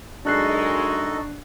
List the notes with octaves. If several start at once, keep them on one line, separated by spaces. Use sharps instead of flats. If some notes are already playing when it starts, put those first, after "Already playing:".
F#2 G#3 D4 D#4 F#4 A4 F#6 C7